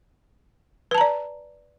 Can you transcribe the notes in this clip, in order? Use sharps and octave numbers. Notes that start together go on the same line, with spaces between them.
B4 D5 A5 A#5